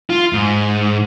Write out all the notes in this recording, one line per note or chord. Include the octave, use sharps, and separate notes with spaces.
F4
G#2